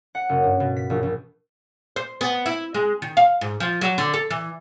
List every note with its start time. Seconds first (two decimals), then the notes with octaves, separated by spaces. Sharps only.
0.15 F#5
0.29 F#1
0.44 G2
0.60 B2
0.77 B6
0.90 A#1
1.03 A#1
1.96 C5
2.21 B3
2.46 E4
2.74 G#3
3.02 D#3
3.17 F5
3.41 G#2
3.60 F3
3.81 F#3
3.98 D3
4.14 A4
4.30 E3